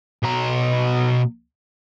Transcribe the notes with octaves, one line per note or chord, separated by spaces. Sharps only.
B2 A#5